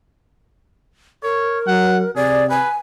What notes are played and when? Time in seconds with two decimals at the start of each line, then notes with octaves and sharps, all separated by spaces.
1.23 A#4 C#5
1.67 F#3 F#5
2.16 C3 G#4 D5
2.50 B4 G#5